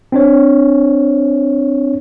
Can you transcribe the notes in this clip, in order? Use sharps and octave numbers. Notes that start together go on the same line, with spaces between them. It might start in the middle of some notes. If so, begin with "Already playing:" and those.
C4 D4 C#5